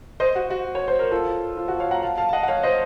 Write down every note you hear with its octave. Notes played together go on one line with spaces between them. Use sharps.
C5 D#5
F#4
F#4
C#5
C5
A#4
F4 A4
F4
F#4
C#5 F5
F#5 A#5
F5 A5
F5 A5
A5
D#5 F#5
F#5
C#5 F5
C5 D#5